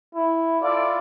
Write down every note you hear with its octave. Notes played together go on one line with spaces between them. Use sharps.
E4
E4 F4 A4 D5